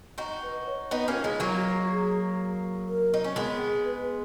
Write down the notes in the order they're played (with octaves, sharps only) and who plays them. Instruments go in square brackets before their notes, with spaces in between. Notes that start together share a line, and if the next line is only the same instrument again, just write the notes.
[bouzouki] D#4 F#4
[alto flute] B4
B4
C#5
[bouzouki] B3 D#4 [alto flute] B4
[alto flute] B4
[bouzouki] A#3 C#4 [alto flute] F#4
[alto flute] F4
[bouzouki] G#3 B3 [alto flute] D#4
[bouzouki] F#3 A#3 [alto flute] F4
[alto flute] F#4
F#4
G#4
A#4
[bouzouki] D#4
C#4
G#3 B3
[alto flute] B4